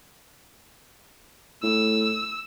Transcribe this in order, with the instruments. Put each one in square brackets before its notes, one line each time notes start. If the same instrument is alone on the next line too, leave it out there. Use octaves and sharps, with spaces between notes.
[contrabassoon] A2 [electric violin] E6